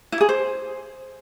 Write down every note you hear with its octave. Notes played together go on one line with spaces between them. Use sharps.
E4
G#4
C5